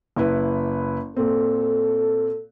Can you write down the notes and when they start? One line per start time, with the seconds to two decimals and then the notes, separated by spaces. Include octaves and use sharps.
0.16 F#1 E4 B4
1.17 A#2 C4 A4